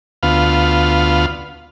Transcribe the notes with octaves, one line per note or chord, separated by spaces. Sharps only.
D2 B3 F4 F5